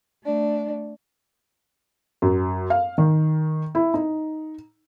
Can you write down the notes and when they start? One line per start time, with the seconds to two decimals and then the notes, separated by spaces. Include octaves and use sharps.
0.24 A3 D4
2.22 F#2
2.70 F5
2.98 D#3
3.75 E4
3.94 D#4